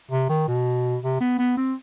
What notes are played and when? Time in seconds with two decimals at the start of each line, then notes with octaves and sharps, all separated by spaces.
0.11 C3
0.29 D#3
0.48 B2
1.03 C3
1.20 B3
1.39 B3
1.57 C4